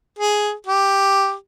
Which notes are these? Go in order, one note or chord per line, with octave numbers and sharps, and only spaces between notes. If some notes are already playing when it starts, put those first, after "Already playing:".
G#4
G4